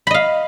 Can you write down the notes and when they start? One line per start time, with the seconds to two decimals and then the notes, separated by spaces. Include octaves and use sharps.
0.07 B5
0.11 D#5
0.14 F5